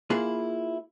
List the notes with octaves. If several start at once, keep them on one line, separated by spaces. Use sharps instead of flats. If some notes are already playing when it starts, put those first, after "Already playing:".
A#3 E4 F4 G#4 B4